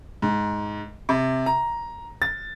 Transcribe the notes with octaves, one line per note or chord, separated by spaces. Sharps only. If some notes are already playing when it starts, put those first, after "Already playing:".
G#2
C3
A#5
A6